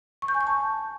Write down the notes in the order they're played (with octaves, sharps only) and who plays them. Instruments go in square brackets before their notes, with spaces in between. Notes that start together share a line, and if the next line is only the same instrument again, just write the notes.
[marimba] C#6
G6
G#5
C#6
A5